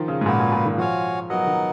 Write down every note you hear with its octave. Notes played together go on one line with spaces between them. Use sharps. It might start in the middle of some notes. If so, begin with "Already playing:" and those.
Already playing: D#3 F3
C#3
G#2
A#2 B3 F#4 B4
A#2
A#2
D#3
F3 F#4 C#5 F5 G#5
F#3 B3 D#4 A#4 D#5 F#5
D#3